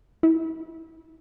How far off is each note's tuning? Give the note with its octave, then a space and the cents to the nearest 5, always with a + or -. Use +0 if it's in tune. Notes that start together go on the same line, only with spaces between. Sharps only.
E4 -25